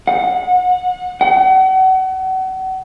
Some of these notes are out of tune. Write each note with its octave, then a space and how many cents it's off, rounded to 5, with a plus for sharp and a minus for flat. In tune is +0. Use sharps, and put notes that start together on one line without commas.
F#5 -25
F#5 +35